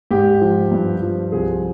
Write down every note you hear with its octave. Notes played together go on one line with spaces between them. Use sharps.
G#2 G4
F3
G2
F3
C2 G#4